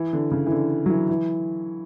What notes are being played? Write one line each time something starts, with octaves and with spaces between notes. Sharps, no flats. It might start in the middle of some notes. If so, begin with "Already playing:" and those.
Already playing: E3
D3
C#3
E3
D3
F#3
E3
E3